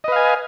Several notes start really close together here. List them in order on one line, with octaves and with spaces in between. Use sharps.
D#5 B4 F5 G#5